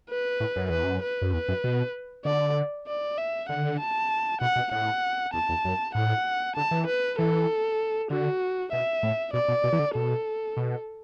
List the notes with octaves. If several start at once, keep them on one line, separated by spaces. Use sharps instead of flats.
B4
A2
F#2
E2 B4
F#2
B4
F#2
E2 B4
F#2
B2
D3 D5
D5
E5
D3 F#5
A5
B2 F#5
B2
A2 F#5
E2 A5
E2
F#2
A2 F#5
D3 A5
E3
B4
E3 A4
D3 F#4
B2 E5
A2
B2 D5
B2
B2
E3
D3
B2 A4
B2